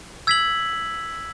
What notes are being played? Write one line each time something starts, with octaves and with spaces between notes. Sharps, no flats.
E6 G#6 B6 F#7